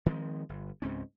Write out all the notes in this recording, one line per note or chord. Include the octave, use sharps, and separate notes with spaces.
D#3 F3 G#3 C4
G1
C#2 G#2 C4 C#4